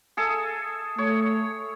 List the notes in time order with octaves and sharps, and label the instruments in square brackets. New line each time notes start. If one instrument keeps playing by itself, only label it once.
[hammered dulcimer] G#4 A4 E5
[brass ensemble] A3 [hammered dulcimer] C#5